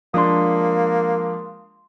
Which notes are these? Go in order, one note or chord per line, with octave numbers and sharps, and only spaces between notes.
F3 G#3 A#3 D4 C6 D#6